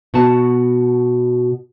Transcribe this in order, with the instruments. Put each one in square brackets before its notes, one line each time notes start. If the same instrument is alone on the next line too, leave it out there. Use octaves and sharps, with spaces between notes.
[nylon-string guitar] B2 F#4 A5